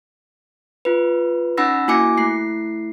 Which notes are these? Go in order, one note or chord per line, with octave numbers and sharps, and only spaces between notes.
F4 B4
C#4 D#4 F#5 B5 E6 A#6
A#3 E4 F#4 G#5 D6 C#7
A3 E4 C7